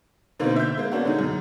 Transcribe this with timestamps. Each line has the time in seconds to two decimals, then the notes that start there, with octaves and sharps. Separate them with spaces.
0.40 B2 D3 A#3 C4 D#4
0.56 E5 G6
0.78 G#3 A#3
0.92 A#3 B3 C#4 D4 F#4
1.05 D3 D#4 G#4
1.19 F#2